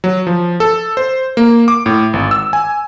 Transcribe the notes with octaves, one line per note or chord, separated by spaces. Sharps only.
F#3
F3
A4
C5
A#3
D6
A2
G#1
E6
G#5